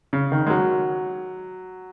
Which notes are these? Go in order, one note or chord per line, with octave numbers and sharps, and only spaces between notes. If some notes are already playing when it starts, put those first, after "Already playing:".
C#3
D#3
G#3
F#3